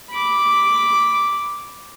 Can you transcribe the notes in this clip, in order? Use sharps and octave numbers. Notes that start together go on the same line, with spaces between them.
B5 D6